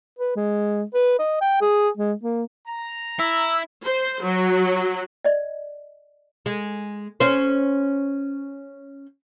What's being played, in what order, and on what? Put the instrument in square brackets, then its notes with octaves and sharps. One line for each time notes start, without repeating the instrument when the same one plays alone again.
[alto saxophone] B4
G#3
B4
D#5
G5
G#4
G#3
A#3
[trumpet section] A#5
[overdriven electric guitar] E4 [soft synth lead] E6
[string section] C5
F#3
[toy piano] D5 D#5
[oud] G#3
C#4 C5